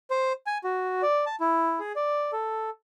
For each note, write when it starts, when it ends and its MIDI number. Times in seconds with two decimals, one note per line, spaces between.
0.10 0.33 72
0.47 0.58 80
0.64 1.02 66
1.03 1.25 74
1.26 1.36 81
1.40 1.79 64
1.79 1.92 68
1.96 2.31 74
2.32 2.70 69